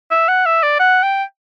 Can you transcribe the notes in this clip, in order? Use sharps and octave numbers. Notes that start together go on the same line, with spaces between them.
E5
F#5
E5
D5
F#5
G5